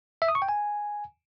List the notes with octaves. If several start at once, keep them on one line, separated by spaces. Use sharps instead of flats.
E5
D#6
C#6
G5
G#5